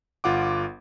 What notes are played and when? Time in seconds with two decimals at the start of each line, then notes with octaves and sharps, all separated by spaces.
0.24 G1 F4 F#5 D6